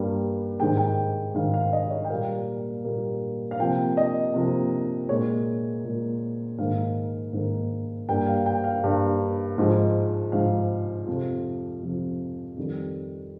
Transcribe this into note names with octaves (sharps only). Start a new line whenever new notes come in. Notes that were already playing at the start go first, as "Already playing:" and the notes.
Already playing: G2 G3 A#3
G#2 D#3 G#3 G5
G5
G#2 D#3 G#3 F5
F5
D#5
C#5
G5
A#2 G3 A#3 F5
A#2 G3 A#3
F5
C3 F3 A#3 G5
D#5
C3 F3 A#3
A#2 G#3 C#5
A#2 G#3
G#2 D#3 A#3 F5
G#2 D#3 A#3
G2 G3 A#3 G5
F5
G5
F5
G2 G3 A#3
G#2 F3 G#3
G#2 F3 G#3 F5
F2 C3 F3
F2 C3 F3
F2 D#3 G3